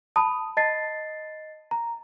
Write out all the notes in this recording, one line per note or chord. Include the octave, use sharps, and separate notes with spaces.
A5 B5 D#6
D#5 A5 A6 C7
A#5